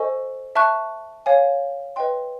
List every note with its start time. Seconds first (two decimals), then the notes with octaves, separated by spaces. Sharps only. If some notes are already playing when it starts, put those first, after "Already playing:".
Already playing: A4 C5 D#5 G#5 C#6
0.55 E5 A5 C#6 F#6
1.26 C#5 F5 G#5
1.96 B4 D#5 G5 C6